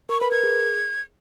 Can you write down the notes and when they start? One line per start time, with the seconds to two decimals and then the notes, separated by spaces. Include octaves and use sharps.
0.09 A#4 C#6
0.21 B4 B5
0.31 A#4 G#6
0.44 G#4